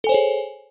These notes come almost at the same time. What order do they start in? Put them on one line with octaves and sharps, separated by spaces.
A4 G#5 C5 C#5 G#4